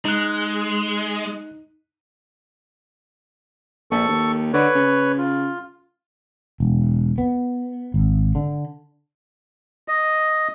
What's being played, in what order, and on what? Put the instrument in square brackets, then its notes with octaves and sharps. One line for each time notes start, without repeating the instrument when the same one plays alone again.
[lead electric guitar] G#3 [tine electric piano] D#4 F#6
[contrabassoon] A#1 [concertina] A4 C#6
[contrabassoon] D#2
[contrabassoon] D3 [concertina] B4 C#5
[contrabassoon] C#3
[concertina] F4
[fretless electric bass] E1
B3
G#1
D3
[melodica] D#5